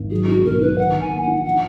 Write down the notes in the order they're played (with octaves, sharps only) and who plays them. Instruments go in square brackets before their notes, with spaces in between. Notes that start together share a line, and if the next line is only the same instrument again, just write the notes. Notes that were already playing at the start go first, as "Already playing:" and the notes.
Already playing: [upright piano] G#1
[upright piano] F#3 [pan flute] G#4
[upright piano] D4 [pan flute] F#4
[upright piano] B1 [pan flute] A#4
[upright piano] D4 [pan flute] B4
[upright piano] D#3 [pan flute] F#5
[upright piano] D#3
[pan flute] G#5
[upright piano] A#3
[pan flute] F#5
[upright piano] D4
[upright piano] F3 [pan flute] F#5